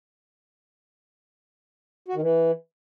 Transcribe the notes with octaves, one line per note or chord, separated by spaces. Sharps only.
F#4
D#3
E3